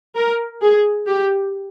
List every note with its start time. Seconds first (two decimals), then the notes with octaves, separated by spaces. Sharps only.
0.15 A#4
0.61 G#4
1.07 G4